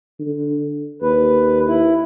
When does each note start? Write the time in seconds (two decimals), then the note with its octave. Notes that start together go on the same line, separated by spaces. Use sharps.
0.20 D3
1.02 D#2 B4
1.68 E4